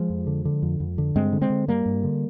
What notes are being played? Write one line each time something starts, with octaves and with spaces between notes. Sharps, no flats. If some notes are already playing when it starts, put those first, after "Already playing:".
Already playing: F3 G#3
F2
D3
D3
F2
F2
D3
G2 G#3 C4
D3
G#3 C4
D3
G2 G3 A#3
G2
D3